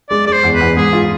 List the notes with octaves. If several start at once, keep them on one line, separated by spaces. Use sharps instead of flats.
G#3 D5
G#3 D5
C5
E2
B4
E2
G#2 G#4
F4